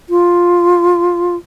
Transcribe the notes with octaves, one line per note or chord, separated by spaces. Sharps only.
F4